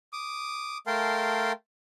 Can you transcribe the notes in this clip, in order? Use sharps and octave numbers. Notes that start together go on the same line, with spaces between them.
D6 D#6
A3 A#4 F5 G5 A5 C6